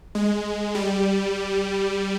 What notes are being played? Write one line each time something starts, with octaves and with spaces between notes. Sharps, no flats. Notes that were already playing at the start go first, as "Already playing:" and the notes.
G#3
G3